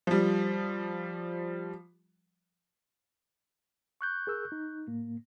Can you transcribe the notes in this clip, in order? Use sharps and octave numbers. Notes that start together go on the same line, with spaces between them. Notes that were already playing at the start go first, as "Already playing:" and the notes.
F3 G3
C#6 F#6 G6
G#4 A#4 E6
D#4
A2 A#3